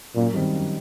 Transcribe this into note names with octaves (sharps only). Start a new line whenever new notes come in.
F#2 A#2
D#3 G3 C4
F#2